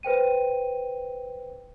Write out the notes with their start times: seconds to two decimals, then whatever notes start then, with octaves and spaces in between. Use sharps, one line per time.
0.03 B4 C5 G5 D#7